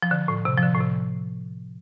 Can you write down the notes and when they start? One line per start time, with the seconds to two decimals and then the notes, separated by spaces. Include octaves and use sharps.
0.02 F3
0.11 D3
0.28 A2
0.45 C3
0.58 F3
0.63 D3
0.75 A2
0.81 C3